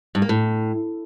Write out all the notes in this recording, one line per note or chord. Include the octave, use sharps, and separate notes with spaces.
G2
A#3
A2